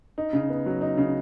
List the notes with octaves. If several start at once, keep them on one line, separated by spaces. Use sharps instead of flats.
D#4
C#3
B3
F#3
D#4
C#3